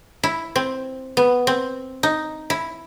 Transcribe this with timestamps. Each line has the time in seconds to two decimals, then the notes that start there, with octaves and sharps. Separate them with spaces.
0.23 E4
0.56 C4
1.17 B3
1.47 C4
2.03 D#4
2.50 E4